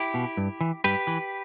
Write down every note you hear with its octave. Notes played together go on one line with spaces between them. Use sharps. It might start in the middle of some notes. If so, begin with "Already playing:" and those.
Already playing: E4 G4
B2
G2
E3
G2 G4 B4
E3